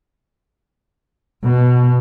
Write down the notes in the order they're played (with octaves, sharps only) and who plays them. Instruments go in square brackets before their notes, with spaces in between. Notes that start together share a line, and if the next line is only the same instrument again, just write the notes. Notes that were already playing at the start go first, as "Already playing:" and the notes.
[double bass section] B2